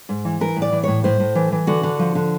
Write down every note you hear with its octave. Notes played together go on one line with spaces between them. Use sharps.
G#2
E3
E3 A#4
A2
D5
E3
A2 C#5
A2 C5
A2
E3
E3
D3 F#4
D3
F3
D3